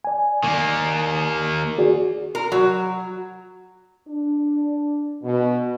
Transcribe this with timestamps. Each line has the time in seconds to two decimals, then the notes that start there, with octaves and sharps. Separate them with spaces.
0.05 D5 G#5
0.43 D#3 A#3
1.79 F#4 G#4 D5
2.35 A#4
2.52 F#3
4.07 D4
5.22 B2